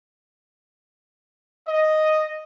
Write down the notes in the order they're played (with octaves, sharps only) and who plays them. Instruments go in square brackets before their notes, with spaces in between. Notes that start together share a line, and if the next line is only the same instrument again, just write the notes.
[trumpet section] D#5